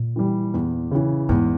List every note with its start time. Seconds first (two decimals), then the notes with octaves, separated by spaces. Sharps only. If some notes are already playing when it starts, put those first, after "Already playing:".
Already playing: A#2
0.16 E3 G3
0.54 E2
0.91 C#3 E3
1.29 E2 G#2